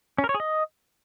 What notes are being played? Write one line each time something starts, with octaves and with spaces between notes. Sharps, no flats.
C#4
A#4
C#5
G#4
D#5